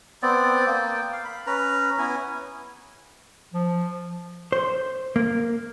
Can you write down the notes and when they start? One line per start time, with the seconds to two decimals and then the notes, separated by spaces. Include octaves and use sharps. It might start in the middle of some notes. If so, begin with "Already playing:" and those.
0.22 B3 C4 D5
0.67 A#3 G5
1.13 F5
1.25 B5
1.46 C#4 B4 A#5
1.99 B3 C#4 E4 G#5
3.54 F3
4.52 C5
5.16 A#3